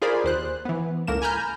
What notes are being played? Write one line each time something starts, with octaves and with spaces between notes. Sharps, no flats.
F4 G#4 A#4 C5 D5 B5
D#2 C5 F#6
E3 B3
C#2 A2 A#3 A#4 E7
G#5 A#5 B5 F6 G6